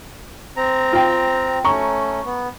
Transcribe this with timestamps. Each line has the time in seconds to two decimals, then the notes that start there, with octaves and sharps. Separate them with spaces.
0.57 C4 A#5
0.92 F4 G5
1.65 A3 C#4 A#5 C#6
2.25 B3